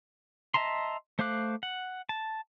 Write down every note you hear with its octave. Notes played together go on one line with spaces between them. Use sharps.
D#5 E5 A5 A#5 C6
A3 C5 F5 D6 F#6
F#5
A5